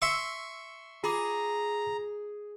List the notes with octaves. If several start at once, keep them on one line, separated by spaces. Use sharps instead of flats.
E5 C6 C#6 E6
F4 G#4 A#5 D6